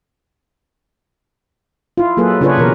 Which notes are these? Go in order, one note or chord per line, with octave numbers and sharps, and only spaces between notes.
E4 F4
F#3 A#3 G#4 A4 B4
C#3 D4 F4 G#4 B4 C#5
B2 E3 A#4